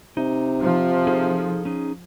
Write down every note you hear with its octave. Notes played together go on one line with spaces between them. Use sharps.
C3 D#4
F3
D#4 G#4 A4
C#4 D#4 G#4